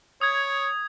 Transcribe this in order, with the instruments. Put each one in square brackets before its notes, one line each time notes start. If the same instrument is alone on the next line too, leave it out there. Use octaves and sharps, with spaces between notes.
[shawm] C#5 [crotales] D#6 G#6